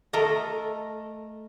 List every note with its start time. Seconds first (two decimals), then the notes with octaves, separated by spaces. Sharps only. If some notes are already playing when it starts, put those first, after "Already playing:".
0.13 A3 A4 A#4 D#5